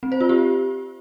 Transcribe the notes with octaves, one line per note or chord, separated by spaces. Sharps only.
C4
C5
F4
G4